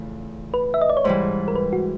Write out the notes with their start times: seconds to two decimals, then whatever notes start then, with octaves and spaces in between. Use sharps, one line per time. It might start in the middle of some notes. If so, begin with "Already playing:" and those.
Already playing: E2 C#3 F3 A3
0.54 B4
0.74 E5
0.81 D#5
0.89 D5
0.97 C#5
1.04 G#2 E3 G3 C5
1.48 A#4
1.56 B4
1.73 F#4